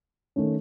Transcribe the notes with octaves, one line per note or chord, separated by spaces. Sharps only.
D#3 A3 C#4